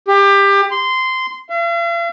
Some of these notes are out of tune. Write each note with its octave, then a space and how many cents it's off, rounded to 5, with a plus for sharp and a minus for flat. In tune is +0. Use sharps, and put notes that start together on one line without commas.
G4 +25
C6 -15
F5 -45